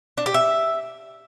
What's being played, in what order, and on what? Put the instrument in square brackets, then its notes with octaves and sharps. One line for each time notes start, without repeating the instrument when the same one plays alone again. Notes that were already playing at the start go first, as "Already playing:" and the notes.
[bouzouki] D4
G4
E5